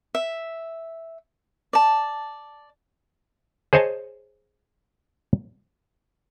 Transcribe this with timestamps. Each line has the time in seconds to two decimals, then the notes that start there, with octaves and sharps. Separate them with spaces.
0.15 E5
1.73 D5 A5
3.73 G#4 C5 C#5 D#5 G#5 A5